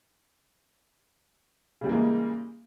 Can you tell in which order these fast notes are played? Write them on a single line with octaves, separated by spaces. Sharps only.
C#3 G3 E3 A#3 G#3